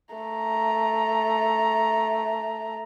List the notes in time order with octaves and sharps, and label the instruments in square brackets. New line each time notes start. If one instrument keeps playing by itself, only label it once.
[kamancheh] A3 A#5